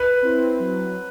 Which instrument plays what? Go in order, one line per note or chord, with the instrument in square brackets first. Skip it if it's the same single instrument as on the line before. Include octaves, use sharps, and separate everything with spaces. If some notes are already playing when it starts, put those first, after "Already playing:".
Already playing: [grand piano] B4
[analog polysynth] C4 E4
F#3